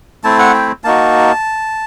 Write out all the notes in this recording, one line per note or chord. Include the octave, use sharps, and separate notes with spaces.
A3 C4 E4 A5
F#5
G5
A#3 D#4 F#4 A5